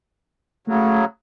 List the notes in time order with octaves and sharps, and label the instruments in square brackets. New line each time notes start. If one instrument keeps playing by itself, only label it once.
[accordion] C#3 F#3 [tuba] A3